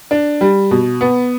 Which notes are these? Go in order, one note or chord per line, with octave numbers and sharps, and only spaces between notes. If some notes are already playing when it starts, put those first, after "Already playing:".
D4
G3
B2
B3